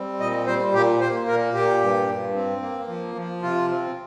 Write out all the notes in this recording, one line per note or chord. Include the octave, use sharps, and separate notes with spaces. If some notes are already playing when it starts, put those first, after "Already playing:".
Already playing: G3 C4
A#2 D#5
G3 C5
A#2 G4
A#3 C5
A#2 A#4
A#2 G4
G2
G2
C4
A#3
F3
F3
C3 F4
C4